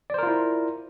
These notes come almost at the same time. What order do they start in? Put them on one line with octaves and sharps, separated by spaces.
D5 C5 A#4 F4 E4